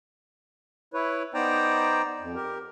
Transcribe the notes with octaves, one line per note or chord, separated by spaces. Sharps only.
E4 B4 C#5
B3 D#4 C5 D5 G5 A#5
F2
G4 A#4